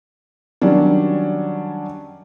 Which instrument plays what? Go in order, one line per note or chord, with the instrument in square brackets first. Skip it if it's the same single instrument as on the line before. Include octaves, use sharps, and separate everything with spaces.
[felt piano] D#3 F#3 G3 C#4 D4